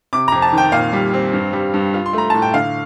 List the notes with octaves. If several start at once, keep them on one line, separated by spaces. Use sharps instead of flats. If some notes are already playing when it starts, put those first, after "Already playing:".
C3 D6
F2 A#5
A5
D#3 G5
A#2 F5
G3
C4
G2
G3
G2
F4
C6
A3 A#5
A2 A5
G5
D3 F5